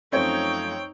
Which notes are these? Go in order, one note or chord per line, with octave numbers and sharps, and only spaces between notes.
F#2 F3 A3 C4 D#4 C#5 G5